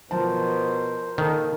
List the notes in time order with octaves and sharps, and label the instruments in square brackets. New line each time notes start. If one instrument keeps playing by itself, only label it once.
[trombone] B2 [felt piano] F3 A5 [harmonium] A#4 C5
[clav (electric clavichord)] D#3 [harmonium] A#3 [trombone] A4